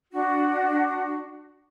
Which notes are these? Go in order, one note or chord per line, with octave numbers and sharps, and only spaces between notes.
D4 F#4